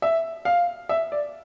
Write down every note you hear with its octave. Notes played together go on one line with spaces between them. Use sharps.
E5
F5
E5
D5